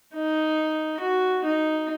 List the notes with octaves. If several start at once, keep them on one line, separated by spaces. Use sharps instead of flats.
D#4
F#4
D#4